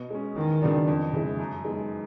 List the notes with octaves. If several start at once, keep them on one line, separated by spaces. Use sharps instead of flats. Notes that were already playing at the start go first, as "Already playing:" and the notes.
Already playing: B2
G#3 C#4
E2 D#3
C#3 F#3 B3 D4
F2
C#3 E3 G#3
F#2
D#3 G#3 B3